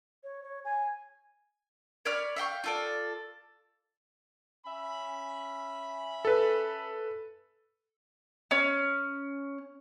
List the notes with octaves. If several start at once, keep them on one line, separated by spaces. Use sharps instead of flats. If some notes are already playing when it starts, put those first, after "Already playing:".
C#5
C#5
G#5
C#5 D5 B5 F6
E5 F5 G5 C#6
F4 A4 D5
C#4 E5 B5
A4 B4
C#4